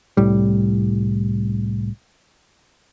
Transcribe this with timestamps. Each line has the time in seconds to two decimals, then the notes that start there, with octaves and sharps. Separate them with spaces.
0.17 C2 A2 G3